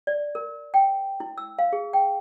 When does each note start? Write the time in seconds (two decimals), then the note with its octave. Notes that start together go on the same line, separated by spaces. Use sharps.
0.07 D5
0.35 A#4
0.74 G5
1.20 E4
1.38 E6
1.59 F5
1.73 G#4
1.93 G5